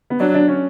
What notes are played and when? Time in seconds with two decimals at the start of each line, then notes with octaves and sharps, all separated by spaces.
0.10 B3
0.20 F#3 D4
0.34 D4
0.48 C#4